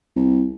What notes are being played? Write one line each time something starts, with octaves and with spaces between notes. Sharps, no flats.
C2